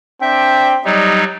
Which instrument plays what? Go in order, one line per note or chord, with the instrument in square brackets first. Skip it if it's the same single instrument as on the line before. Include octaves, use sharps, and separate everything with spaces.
[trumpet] C4 [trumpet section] D4 D5 G5 [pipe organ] E5
[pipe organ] F#3 G3 D#4 [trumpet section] G4 D5 [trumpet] D#5